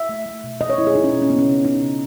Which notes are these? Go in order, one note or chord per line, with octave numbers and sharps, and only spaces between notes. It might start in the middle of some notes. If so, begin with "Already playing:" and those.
Already playing: E5
A3
A3
B2
B2 D#5
C#5
A3 E4
G#4
A3 D#4
C#4
B2
C#4
C#3 B3
C#4
C#3
C#3 D#4
C#3